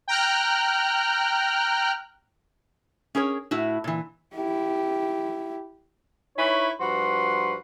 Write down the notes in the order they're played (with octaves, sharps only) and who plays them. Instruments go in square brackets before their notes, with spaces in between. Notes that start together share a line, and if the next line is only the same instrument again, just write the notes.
[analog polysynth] G5 A#5 F6 F#6
[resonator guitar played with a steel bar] C#4 G#4 A#4 C#5
A2 E4 F#4
A#2 E3
[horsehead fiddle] E4 G4
[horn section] D#4 E4 B4 C#5
G2 F3 F#4 B4 C6